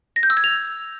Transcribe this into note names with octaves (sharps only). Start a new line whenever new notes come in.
A#6
G6
E6
G#6
F7